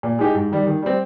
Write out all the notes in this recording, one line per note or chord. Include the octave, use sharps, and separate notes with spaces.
A#2
G#3 D#4 G4
G#2
D#3 G3
D#3
G3 C4